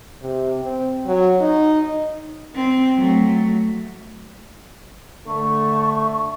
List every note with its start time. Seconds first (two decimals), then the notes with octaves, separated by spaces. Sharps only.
0.23 C3
0.62 C4
1.07 F#3
1.41 D#4
2.55 C4
2.97 F#3 A3
5.27 D3 A3 C#6